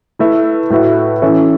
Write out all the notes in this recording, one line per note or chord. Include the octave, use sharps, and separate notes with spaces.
A3 E4 B4 E5
A2 A3 F#4 B4 E5
E3 C#4 A4 C#5 E5